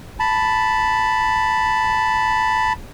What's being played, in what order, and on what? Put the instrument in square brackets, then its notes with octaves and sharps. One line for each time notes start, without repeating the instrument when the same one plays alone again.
[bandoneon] A5 B5